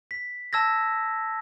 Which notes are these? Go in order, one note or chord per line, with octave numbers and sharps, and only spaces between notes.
B6
A5 E6 G#6 A#6